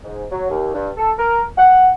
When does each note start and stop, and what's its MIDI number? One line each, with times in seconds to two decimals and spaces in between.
0.04 0.23 44
0.31 0.46 54
0.50 0.69 39
0.74 0.89 43
0.97 1.11 69
1.18 1.43 70
1.58 1.90 78